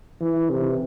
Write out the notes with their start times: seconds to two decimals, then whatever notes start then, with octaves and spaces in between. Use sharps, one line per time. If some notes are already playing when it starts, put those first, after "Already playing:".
0.21 E3
0.50 C3